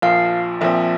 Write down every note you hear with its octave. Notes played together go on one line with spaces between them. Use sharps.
A#1 A#2 F3 F5
A#1 A#2 F3 C4 E5